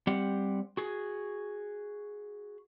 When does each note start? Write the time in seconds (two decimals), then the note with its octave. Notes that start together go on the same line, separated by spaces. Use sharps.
0.07 G3 C4 G4 F#5
0.77 F#4 G#4